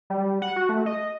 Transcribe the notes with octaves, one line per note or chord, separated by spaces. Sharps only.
G3
F#5
F#4
A3
D#5